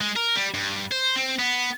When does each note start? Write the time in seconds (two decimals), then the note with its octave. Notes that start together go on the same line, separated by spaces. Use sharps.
0.01 G#3
0.16 A#4
0.36 G3
0.54 G2
0.92 C5
1.16 C4
1.39 B3